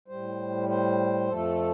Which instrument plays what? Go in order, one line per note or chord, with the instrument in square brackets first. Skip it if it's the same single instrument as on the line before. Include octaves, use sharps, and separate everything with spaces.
[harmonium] A2 G3 C5
C5
F2 F3 A3 A4